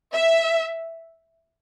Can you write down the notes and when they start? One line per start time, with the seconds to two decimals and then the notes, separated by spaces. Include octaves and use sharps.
0.13 E5